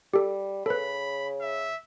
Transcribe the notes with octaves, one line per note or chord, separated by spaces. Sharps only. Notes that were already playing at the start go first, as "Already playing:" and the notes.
G3 G4 A4
C#3 A4 B4 B5
E5